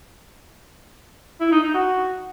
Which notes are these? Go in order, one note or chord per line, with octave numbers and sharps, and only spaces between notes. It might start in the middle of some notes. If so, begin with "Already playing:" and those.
E4
D#4
D#4
F#4